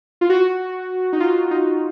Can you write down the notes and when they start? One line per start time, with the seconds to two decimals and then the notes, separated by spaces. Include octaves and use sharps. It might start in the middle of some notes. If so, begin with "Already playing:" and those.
0.21 F4
0.30 F#4
1.13 D#4
1.20 F4
1.51 D#4